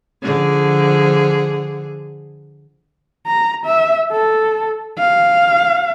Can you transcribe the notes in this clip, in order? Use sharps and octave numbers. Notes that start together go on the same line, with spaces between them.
D3 F3 G#4
A#5
E5
A4
F5